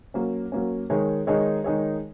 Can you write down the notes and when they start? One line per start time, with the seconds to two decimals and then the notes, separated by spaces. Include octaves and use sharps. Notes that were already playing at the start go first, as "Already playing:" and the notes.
0.14 F#3 A#3 C#4
0.52 F#3 A#3 C#4
0.90 D#3 G#3 D#4 G#4 C#5
1.27 D#3 G#3 D#4 G#4 C#5
1.64 D#3 G#3 D#4 G#4 C#5